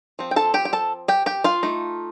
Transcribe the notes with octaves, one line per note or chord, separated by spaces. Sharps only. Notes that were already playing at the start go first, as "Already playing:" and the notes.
F3 C4
G5
A4 A5
G4 G5
G5
A4 A5
G4 G5
G4 G5
F4 F5
A3 D#4